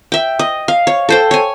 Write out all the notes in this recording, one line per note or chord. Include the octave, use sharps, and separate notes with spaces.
E5 G5
D#5
F5
C#5
A4 C5 G5
C#5 G#5